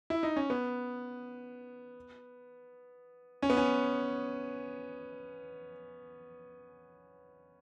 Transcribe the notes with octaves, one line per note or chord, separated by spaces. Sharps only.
E4
D#4
C#4
B3
C#4
B3
C#4